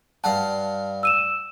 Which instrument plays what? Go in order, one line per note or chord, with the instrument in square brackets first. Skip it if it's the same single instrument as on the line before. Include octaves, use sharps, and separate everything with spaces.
[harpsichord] G2 F5 F#5 [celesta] A5
[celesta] E6 D#7 E7